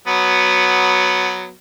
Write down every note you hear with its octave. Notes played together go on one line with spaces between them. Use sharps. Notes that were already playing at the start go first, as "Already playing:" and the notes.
F#3 B3